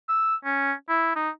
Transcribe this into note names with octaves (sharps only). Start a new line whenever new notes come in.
E6
C#4
E4
D#4